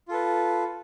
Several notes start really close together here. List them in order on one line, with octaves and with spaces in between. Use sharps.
F4 A4 B4